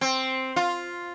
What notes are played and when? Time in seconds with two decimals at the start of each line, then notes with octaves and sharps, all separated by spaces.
0.01 C4
0.56 F4